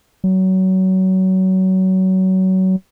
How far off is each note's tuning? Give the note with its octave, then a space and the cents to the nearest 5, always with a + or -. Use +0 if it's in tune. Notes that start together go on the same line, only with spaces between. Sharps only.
F#3 +25